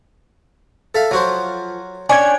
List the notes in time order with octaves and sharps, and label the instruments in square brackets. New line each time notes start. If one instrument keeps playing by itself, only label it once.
[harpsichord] A4 E5 F5
[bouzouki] F3 [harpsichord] F#3 F#4 C5
[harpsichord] C#4 [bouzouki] D4 C#5 G5 [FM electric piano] G#5 G#6